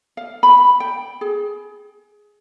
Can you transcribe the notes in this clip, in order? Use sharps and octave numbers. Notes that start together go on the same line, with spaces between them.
F5
B5
G5
G#4